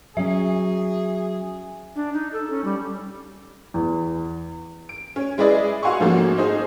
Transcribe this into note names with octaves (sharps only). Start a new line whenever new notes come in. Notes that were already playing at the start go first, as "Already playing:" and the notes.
F#3 C#4 G#4 E5
D4
D#4
A4
C#4
G3
E2
D7
C#4
G#3 E4 G#4 B4 D5 D#5
F#4 F5 F#5 G#5 C6 C#6
G#2 F3 A3 A#3 C#4 F#4
D#4 G#4 C5 D#5